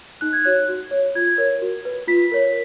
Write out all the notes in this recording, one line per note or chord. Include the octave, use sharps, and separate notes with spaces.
D#4 F#6
G#6
F#4 C#5 F#6
F#4
C#5
F4 G#6
A#4 C#5
F#4
B4
F4 B6
A#4 C#5